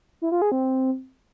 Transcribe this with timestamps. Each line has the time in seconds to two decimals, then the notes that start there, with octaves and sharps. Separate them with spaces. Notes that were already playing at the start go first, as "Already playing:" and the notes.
0.22 E4
0.32 F4
0.42 G#4
0.52 C4